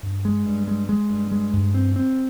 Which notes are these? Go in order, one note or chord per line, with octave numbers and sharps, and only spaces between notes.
G2
G#3
G2
G#3
G#3
G2
G#3
G2
C4
C4